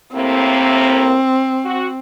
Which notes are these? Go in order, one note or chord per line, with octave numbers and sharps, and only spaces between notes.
A2 C3 A#3 C4
F#4